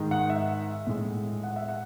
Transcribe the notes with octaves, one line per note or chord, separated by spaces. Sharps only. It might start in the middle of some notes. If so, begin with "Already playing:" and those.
Already playing: G#2 D#3 G#3
F#5
E5
A2 G#3
F#5
E5
F#5